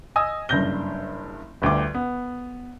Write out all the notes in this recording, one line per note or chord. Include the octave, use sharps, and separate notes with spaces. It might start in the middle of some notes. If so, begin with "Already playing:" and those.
D#5 G#5 D#6 E6
F#1 G2 C#3 G6 A#6 G7
G1 D2 G5 D6
B3